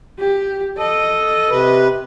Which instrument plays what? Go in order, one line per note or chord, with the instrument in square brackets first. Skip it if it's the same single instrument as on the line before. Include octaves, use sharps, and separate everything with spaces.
[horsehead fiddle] G4
[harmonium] A4 [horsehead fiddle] D#5
[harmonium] C3 B4